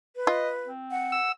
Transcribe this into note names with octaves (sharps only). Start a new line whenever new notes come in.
B4
F4 D#5
C4
F#5
E6